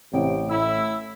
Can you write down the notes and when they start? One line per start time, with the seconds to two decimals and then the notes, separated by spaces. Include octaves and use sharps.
0.13 A1 C3 G5
0.49 A2 E4 E6